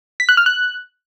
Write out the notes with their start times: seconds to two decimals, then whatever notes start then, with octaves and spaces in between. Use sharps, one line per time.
0.20 B6
0.29 F#6
0.37 F6
0.46 F#6